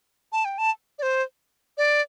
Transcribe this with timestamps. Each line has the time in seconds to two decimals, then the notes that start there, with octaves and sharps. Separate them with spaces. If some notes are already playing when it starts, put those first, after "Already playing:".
0.32 A5
0.45 G5
0.58 A5
0.99 D5
1.03 C5
1.78 D5